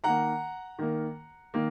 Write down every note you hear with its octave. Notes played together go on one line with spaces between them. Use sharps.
D#3 A#3 F#5 A#5
D#3 A#3
D#3 A#3